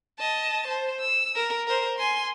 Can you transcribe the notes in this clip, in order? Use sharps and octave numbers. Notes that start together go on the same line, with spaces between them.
D#5 A5
C5
E6
A#4
A#4 C5
G#5 C6